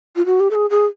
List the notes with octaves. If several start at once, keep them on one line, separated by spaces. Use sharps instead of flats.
F4
F#4
G4
A4
G#4
G#4